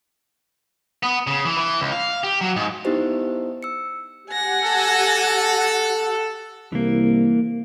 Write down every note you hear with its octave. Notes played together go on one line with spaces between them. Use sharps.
B3
C#3
E3
E3
C#2
F5
G4
F#3
G#2
B3 D#4 E4 G4 C5
E6 C#7
G4 F#5 G#5 A#6
A4
C2 E3 A#3